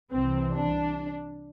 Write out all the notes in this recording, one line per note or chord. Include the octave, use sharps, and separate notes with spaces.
C2 C3 E3 C4
D4